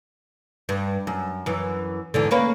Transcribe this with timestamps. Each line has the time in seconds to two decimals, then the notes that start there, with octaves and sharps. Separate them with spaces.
0.69 G2
1.07 F#2
1.46 F#2 E3
2.14 E2 G#2 D3
2.31 A#3 C#4 B4